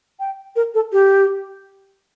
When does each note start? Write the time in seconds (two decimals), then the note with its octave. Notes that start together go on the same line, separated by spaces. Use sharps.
0.20 G5
0.56 A#4
0.74 A4
0.92 G4